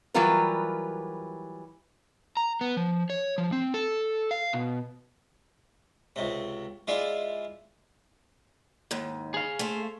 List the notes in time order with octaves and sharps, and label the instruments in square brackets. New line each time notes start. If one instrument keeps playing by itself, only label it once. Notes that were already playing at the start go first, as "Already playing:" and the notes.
[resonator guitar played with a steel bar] E3 F#3 G3 F4 A#4 B4
[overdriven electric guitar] A#5
B3
F3
C#5
F3
C4
A4
F5
B2
[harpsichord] C#2 C3
G#3 E4 F4 D5
[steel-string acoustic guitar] D#2 G#2
[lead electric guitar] G#4 F5
[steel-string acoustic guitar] A3 C5